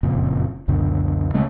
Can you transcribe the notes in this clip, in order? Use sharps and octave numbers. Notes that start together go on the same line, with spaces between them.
F#1 F2 A#2 C#3
C#2 F#2 B2 D3
C#3 G#3 A3 C#4